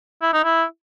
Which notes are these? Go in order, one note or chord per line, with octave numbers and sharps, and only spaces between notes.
E4
D#4
E4